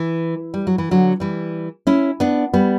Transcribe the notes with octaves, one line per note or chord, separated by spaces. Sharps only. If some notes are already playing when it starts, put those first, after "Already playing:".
Already playing: E3
G3
F#3
E3
D3 F#3
E3 G3
C#4 E4
B3 D4
G3 B3